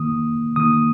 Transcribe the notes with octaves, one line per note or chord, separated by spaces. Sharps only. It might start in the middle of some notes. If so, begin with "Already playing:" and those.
Already playing: D#3 A#3 D#6
D#3 A#3 D#6